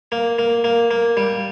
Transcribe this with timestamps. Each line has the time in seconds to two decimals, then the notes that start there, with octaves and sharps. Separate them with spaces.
0.12 A#3
0.39 A#3
0.64 A#3
0.91 A#3
1.17 G3